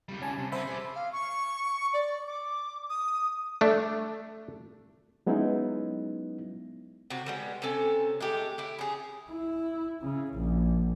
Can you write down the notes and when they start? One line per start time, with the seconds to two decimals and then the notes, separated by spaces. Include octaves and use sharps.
0.09 C#2 G3
0.22 C#4 G#5 A5
0.38 C3
0.52 D3 B3 C5 E5 B5
0.67 G#4 D5
0.95 F5
1.12 C#6
1.93 D5
2.27 D6
2.90 D#6
3.61 A3 D4
5.26 F#3 G#3 B3 C#4 D#4 E4
7.10 C3 F#4
7.26 G3 G#3 B3
7.62 C3 C#4 A4 G#5
8.20 G#3 A3 G4
8.58 E4 G4
8.79 C#4 G#4
9.31 E4
10.02 C#3
10.34 A#1